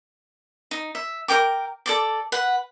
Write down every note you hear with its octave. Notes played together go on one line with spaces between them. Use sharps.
D#4
E5
A#4 C#5 G5 D6
A4 D5 D6
B4 F#5